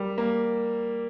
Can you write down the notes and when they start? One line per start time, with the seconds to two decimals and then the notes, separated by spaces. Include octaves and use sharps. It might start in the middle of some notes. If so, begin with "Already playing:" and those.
Already playing: G3 G4 A#4 D5
0.18 A#3